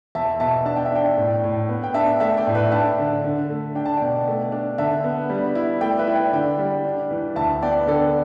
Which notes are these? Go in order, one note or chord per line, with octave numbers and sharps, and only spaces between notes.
E2 E5 A5
B2 E5 A5
D4 A5
G5
E5
D4 D5 G5
A2
A2
B3
G5
D4 E5 A5
A3 E5 A5
D5 G5
A2
B4 E5
D4 E5 A5
D3
D3
A3
D4 G5
A5
B2 D5 G5
A3
D4
D3 E5 A5
B3
G3
E4
A3 D5 G5
B4 E5
E4
D5 G5
D3 D5 G5
G3
D4
E3
D2 E5 A5
B3 D5 G5
D3 A4 D5